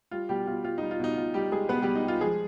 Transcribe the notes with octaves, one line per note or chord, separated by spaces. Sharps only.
G3 F4
B2 G3 G4
B2 F4
G3 F4
G3 D#4
F4
B2 D#4
B2 F4
G3 G4
G3 G#3 G#4
B2 B3 B4
G3 G4
B2
D#4
G3 F4
F3 G#3 G#4